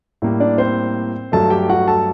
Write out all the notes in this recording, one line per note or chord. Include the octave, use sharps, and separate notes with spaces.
A2 G3 A#3
D4 D5
C4 C5
G2 F#3 A3 A4 A5
G4 G5
F#4 F#5
A4 A5